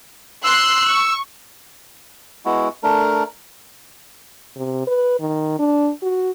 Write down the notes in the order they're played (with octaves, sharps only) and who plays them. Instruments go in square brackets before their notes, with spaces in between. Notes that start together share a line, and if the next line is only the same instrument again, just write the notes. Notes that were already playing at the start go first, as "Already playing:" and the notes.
[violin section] C6 F#6 [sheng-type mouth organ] E6
[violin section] C#6
[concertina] G#3 B3 E4 F#4
A3 D4 A#4
[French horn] C3
B4
D#3
D4
F#4